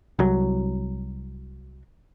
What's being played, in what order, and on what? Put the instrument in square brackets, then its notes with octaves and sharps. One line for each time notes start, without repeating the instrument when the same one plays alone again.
[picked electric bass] C2 F#3